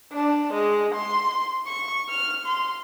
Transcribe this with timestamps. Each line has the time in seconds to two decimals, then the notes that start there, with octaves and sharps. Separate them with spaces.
0.12 D4
0.53 G#3
0.95 C6
1.66 C#6
2.09 F6
2.46 C6